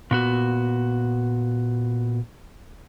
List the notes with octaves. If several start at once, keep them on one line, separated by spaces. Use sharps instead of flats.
A#2 B3 F#4